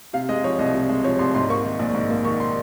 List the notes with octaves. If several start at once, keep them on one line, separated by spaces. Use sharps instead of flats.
C3 F5
G#3 D#5
F3 C#5
C2 D#5
C3
G#3
F3 C#5
C2 C6
G#2 C6
A#3 C#6
D#3
A#1
G#2
A#3
D#3 C#6
C6